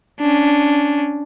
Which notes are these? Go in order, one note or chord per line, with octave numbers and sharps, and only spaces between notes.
C#4 D4